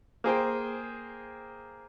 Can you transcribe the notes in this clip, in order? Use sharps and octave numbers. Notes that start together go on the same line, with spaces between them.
A#3 G#4 C5 G5